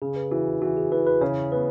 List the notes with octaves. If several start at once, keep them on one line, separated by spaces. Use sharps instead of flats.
C#3 G#4
B4
E3 F#4
E3 F#4
G#4
E3 B4
B4
C#3 C#5
B3 B4